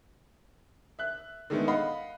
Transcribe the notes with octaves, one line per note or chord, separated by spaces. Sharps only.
E5 F#6
D3 D#3 G#3 A3 B3
D#5 F5 F#5 B5